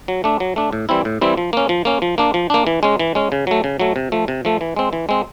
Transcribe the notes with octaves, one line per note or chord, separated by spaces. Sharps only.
F#3
A3 D4
F#3
A3 D4
A2
E3 G3 C4 E4
A2
E3 G3 C4 E4
F3
A#3 C#4
F3
A#3 C#4
F3
A#3 D4
F3
A#3 D4
E3
G#3 C#4
E3
G#3 C#4
C#3
F#3 A3
C#3
F#3 A3
C3
F3 A3
C3
F3 A3
E3
G#3 C4
E3
G#3 C4